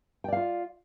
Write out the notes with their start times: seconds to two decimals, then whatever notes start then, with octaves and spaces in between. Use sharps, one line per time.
0.24 G5
0.28 D5
0.33 F5
0.37 F4